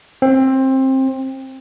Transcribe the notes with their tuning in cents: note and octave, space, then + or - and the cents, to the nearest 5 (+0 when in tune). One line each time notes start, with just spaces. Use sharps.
C4 +20